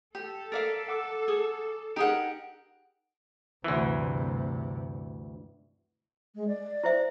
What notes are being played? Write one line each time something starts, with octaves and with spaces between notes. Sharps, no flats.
G4 A4
A#4 D5 F5 A6 B6 D7
F#5 D6 E6
G#4
D#4 G4 G#4 A#4 F#5 D7
D2 G2 C3 E3
G#3
D5
E4 C5 E5